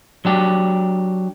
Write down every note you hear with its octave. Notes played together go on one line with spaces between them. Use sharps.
F#3 D4 G4